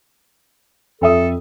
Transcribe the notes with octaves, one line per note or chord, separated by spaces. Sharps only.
F2 A4 E5 D#6